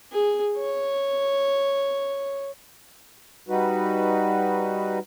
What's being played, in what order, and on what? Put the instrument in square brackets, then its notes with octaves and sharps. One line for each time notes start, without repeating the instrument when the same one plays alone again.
[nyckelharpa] G#4
C#5
[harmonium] G3 D#4 F#4 B4